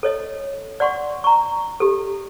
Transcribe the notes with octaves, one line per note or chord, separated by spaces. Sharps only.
A4 C#5 D#5
D5 F#5 C6 C#6
A#5 C#6
G4 A4